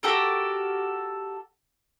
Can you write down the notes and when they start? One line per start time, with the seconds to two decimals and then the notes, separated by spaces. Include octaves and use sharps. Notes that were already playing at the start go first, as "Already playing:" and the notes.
0.03 F#4 G4 A4 A#4